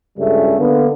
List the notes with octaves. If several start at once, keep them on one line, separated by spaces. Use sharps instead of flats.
C#2 G2 C#3 G3 A3
D3 A#3 B3